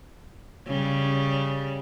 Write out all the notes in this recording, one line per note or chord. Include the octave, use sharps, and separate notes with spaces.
C#3 G3